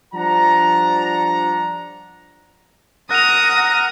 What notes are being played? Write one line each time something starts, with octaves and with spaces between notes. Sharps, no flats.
F3 G3 D4 F#5 A#5
A#4 F#5 A#5 D#6 F#6 A#6 D#7 F7